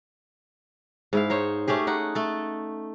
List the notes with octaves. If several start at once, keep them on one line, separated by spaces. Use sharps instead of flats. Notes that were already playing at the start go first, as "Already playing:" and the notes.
G#2 E4 F5
D#4 C5 C#5
A3 C#4 G4 G#4
D#4 F#5
A3 A4